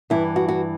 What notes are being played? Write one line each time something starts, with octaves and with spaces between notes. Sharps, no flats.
G2 E3 E4
F#4
F#4